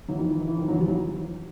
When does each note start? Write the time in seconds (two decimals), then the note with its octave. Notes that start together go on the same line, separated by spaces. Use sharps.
0.08 E3 F#3
0.18 D#3 F3
0.28 E3
0.38 D#3
0.48 E3
0.58 D#3 F3
0.68 E3 F#3
0.78 F3 G3
0.87 E3 F#3
0.99 E3